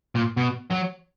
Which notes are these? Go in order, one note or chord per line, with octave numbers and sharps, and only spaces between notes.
A#2
B2
F#3